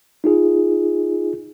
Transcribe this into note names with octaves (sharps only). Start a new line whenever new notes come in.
D#4 F4 G#4